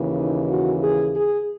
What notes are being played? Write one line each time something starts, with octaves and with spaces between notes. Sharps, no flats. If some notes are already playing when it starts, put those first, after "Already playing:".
Already playing: D#2 C#3 E3
D#4
F#4
G#4
G#4